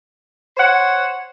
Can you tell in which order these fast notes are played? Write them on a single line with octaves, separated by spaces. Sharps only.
C5 C#5 F#5